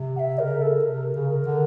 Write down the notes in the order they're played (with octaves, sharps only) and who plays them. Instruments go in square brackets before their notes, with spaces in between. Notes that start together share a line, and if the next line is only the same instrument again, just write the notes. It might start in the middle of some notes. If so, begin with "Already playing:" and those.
Already playing: [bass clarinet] C3
[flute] F#5
E5
[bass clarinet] C#3 [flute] A#4
[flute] A4
[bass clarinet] C3 [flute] A#4
[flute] A#4
[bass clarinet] C#3
[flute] A#4
[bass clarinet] D3